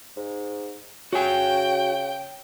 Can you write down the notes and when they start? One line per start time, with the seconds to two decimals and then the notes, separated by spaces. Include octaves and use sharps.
0.17 G#2
1.13 C#3 F#4 G5 G#5